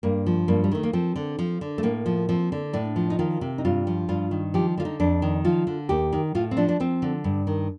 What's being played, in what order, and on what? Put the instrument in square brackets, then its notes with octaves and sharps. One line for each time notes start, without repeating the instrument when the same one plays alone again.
[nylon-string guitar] G2 A#3
F3
G2 A#3
G3
D#3 A3
A#3
F3 C4
D3
F3
D3
A3
A2 A#3
F3
F3 C4
D3
A2 D4
F3
D#4
D#3 F4
C3
D#4
G2 F4
F3
G2 F4
D#3
F3 G4
D3 F4
D#4
F2 D4
D#3
F3 F4
D3
D#2 G4
D#3
A2 F4
C4
F3 D4
D4
F3 C4
D3
G2
D#3